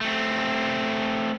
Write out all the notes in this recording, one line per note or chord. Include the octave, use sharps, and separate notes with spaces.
A3 C4